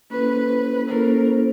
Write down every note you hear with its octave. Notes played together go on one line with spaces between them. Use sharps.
A#3 C#4 E4 A4 B4 C5
A#3 C#4 E4 A4 A#4 C5